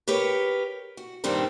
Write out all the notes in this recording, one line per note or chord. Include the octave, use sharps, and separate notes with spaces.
G4 A#4 B4 C#5
F#4
G2 A#2 D#3 G3 C4 D4